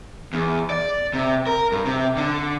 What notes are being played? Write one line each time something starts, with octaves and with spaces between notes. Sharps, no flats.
E2
D5
C3
A#4
G2
C3
D3